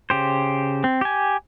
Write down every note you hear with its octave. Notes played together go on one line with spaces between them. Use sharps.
C#3 G4 C5
C4
G4 G#5